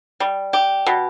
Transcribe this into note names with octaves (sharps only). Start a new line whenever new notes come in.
G3
G4
B2